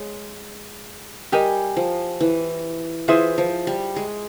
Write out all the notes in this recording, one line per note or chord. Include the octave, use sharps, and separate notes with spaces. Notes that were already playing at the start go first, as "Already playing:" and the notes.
Already playing: G#3 C#5
G3 G4 A#4 D#5 G#5
F3
E3
E3 F4 G#4 C5 E5
F3
G3
G#3